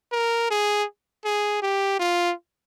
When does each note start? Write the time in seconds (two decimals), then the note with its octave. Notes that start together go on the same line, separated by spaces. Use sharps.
0.12 A#4
0.50 G#4
1.25 G#4
1.62 G4
1.99 F4